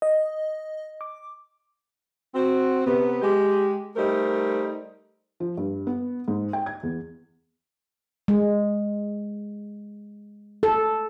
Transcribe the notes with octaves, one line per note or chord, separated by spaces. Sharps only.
D#5
D6
C4 F#4
C3 B3
G#3 G4
G3 A3 D#4 A#4 C5
F3
G2
B3
G#2
G5
G#6
E2
G#3
A4